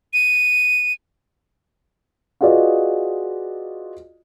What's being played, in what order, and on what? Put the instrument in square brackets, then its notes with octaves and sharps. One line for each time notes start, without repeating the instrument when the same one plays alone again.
[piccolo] D#7
[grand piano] F4 F#4 G#4 B4 D5 D#5